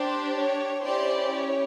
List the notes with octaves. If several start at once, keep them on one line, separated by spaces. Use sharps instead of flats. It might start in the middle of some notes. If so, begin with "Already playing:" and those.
Already playing: D4 G4 C5
C#5
C#4 E4 G4 C5 D5
C#5